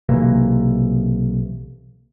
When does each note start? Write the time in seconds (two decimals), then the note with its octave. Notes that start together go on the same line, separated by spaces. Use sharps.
0.09 B1 C3 E3 A#3